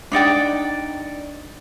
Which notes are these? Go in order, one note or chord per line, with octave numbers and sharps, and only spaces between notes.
D4 D#4 D5 G5